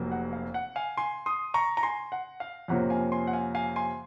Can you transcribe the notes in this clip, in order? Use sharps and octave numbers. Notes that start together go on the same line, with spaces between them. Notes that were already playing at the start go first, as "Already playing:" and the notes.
Already playing: F1 F2 C3 F#3 A#3
F#5
F5
F#5
F5 G#5
G#5 C6
C6 D#6
A#5 C#6
A#5
G#5 C6
F#5
F5
F2 C3 F3 A#3 C#4 F#5
F5 G#5
G#5 C6
F#5
F5 G#5
F5 G#5
G#5 C6